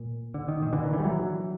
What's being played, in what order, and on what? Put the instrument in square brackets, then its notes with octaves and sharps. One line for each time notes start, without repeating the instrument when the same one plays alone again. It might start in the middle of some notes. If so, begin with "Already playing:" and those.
Already playing: [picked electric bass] A#2
D3
D#3
A#2 D#3
D3 E3
D#3
D3 E3
G3
E3 F#3